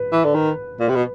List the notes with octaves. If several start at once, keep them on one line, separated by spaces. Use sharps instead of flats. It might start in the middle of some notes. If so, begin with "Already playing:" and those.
Already playing: B4
E3
D3
D#3
A#2
C3
B2